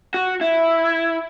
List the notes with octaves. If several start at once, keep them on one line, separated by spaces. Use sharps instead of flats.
F#4
E4